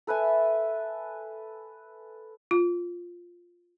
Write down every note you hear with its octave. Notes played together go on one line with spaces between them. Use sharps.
A4 B4 E5 G#5
F4